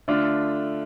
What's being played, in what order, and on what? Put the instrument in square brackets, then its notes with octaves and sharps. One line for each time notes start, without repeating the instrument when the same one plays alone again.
[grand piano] D3 A3 D4 F4